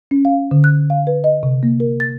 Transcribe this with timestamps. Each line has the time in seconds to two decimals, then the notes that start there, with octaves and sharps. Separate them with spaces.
0.11 C#4
0.25 F5
0.51 D3
0.64 F#6
0.90 F5
1.07 B4
1.24 D#5
1.43 C3
1.63 A#3
1.80 A#4
2.00 A6